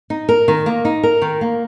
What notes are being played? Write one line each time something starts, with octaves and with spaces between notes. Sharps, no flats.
D#4
A#4
D#3
A#3
D#4
A#4
D#3
A#3